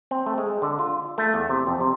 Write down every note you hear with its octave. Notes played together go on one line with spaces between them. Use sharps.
C4
A3
G#3
D3
F4
A3
E2
C3
F2
C3